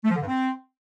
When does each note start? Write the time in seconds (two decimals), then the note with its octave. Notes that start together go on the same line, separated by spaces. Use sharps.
0.04 A3
0.10 F3
0.16 D3
0.22 G2
0.28 C4